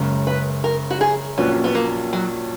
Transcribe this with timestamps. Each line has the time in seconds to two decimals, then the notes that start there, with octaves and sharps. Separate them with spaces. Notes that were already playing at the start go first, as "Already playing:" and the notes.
Already playing: F#1 F#2 C#3 G#3
0.27 B4
0.64 A#4
0.90 F#4
1.01 G#4
1.38 A#1 A#2 F#3 B3 C#4
1.64 B3
1.75 A#3
2.13 F#3